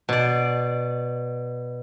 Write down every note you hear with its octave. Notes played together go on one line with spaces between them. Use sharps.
B2 D5